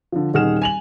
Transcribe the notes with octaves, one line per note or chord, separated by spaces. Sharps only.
D3 F3
D#1 D#3 G#4 F#5 F6 E7
G#5 F7 F#7